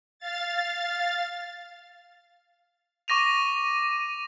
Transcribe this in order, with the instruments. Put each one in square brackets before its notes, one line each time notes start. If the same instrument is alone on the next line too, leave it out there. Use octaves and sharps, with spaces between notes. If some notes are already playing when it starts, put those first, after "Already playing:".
[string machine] F5 A6
[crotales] C#6 D6 A#6 D#7 F7